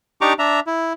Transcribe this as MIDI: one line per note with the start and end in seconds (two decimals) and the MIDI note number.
0.21 0.33 62
0.21 0.33 63
0.21 0.33 67
0.21 0.33 82
0.21 0.33 85
0.21 0.33 86
0.39 0.60 62
0.39 0.60 76
0.39 0.60 82
0.67 0.93 64